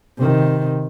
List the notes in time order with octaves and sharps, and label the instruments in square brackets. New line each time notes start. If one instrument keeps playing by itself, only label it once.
[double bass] C3 D#3